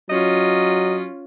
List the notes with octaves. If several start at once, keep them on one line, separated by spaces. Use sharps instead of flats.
F#3 C#4 F4 D#5